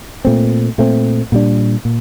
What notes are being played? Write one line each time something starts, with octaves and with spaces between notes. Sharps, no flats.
A#2 A3 C4
A#2 A3 C4
A#2 G3 D4
A#2